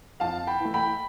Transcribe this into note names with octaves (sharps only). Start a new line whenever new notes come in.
F2 F5 A5
G5 B5
E3 A3
G5 B5